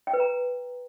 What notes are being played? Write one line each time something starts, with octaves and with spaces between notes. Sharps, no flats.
G5
B4
A#5